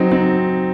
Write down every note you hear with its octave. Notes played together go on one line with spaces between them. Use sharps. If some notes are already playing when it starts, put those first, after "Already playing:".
Already playing: F#3 C4 D#4
C4 D#4